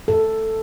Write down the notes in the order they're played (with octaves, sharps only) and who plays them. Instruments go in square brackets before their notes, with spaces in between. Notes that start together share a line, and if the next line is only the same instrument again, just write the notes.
[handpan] A4